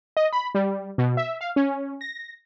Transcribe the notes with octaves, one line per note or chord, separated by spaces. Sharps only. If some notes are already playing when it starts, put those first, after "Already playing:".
D#5
B5
G3
B2
E5
F5
C#4
A#6